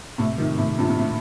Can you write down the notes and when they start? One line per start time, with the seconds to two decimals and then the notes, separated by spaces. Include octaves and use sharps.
0.18 A2 C3
0.38 C3 D#3
0.58 A2 C3
0.78 G2 A#2
0.89 G2
0.99 A2